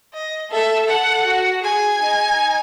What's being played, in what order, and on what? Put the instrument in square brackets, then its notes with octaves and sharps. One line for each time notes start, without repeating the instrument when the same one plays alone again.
[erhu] D#5
[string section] A4 [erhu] E5
[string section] A4 [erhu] F#5
[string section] F#4
[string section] G#4 [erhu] G#5
[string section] D#4